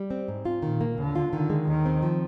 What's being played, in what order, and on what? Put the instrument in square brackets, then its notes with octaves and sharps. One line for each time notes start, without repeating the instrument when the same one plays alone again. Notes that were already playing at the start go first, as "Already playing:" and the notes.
Already playing: [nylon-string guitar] G3
C4
G#2
F4
[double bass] A#2 [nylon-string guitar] D#3
[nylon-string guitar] A#3
[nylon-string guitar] D#2 [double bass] D3
[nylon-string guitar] F4
[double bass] D3 [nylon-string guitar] D#3
[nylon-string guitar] G#3
[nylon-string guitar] D#2 [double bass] D#3
[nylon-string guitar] C4
F3